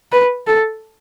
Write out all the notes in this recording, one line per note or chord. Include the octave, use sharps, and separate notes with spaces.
B4
A4